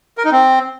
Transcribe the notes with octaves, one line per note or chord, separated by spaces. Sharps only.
A#4
D#4
C4